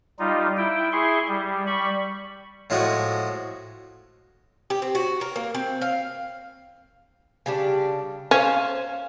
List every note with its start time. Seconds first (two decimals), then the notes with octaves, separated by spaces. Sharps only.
0.19 G3 D#4 F4
0.57 E4 G5
0.92 E4 G#4 C6 C#6
1.27 G3
1.67 G3 B5 C#6
2.70 A2 F3 G#3 A3 F#4
4.70 G4
4.82 C4
4.95 F#4
5.21 A#4
5.36 A#3
5.55 C4
5.82 F5
7.46 C#3 G3 D4
8.31 C#4 C5 F5